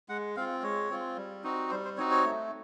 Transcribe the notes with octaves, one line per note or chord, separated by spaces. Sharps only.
G#3 F#5
C4 F4 F5
G#3 C#5
C4 F4
G3
C4 D#4 F#4
G3 C5
C5
C4 D#4 F#4 C#5
C#5
A3